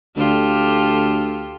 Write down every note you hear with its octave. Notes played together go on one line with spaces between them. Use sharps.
D2 F4 G4 A4